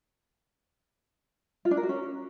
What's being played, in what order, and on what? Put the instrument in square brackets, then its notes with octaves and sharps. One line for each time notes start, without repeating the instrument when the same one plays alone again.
[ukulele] F4
D4
A#4
F#4
C#4